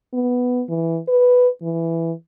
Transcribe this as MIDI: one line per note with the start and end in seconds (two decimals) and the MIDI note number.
0.14 0.63 59
0.70 1.00 52
1.08 1.48 71
1.62 2.12 52